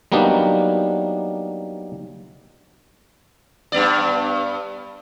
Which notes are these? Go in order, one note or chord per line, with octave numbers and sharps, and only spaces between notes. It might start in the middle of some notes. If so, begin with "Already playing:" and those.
F#3 G3 A#3 B3 D4 D#4
G2 B3 D5